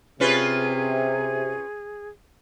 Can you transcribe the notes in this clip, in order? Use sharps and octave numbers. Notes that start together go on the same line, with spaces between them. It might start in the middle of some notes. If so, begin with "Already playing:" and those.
C3 C#4 F4 G#4 B4